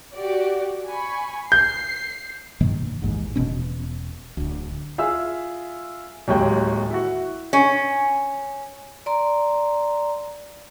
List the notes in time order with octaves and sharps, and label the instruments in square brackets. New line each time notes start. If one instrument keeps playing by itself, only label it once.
[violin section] F#4 G4 D5
G#5 B5 C#6
[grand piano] G6 [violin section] C7
[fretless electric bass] G2 B2 D#3 A#3
A1 D#2 G#2
E1 B2 B3 C#4
D1 D2
[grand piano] F4 G#4 E5 E6
D1 D#2 F#3 G#3 G5
E4 F#4
[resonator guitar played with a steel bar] C#4
[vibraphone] D5 A#5 C6